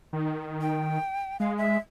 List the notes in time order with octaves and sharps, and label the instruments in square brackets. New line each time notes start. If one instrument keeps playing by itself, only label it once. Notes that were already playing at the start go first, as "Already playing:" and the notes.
[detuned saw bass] D#3
[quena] G5
[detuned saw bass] G#3 [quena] F5
[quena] E5